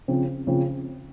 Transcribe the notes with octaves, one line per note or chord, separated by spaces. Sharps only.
C#3 F3 C4
C#3 F3 C4